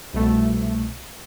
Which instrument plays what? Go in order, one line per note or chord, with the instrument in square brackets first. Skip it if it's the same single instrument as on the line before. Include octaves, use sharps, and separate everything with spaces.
[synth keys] C2 B2 A3